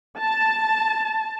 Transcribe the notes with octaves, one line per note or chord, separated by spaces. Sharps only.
A5